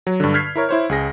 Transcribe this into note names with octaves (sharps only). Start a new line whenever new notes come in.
F#3
G2 D3
F6 G6 G#6 B6 C7
E4 A#4 C#5
E4 C5 C#5
C#2 G#4 A#6